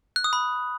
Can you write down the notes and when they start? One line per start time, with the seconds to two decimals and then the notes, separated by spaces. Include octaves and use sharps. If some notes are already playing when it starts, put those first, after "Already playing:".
0.16 F#6
0.24 D#6
0.33 B5